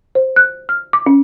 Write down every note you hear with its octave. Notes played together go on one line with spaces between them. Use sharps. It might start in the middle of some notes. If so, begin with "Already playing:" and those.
C5
F#6
F6
D6
C#4